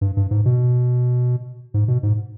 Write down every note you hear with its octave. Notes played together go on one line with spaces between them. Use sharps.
G2
G2
G#2
B2
G#2
B2
G#2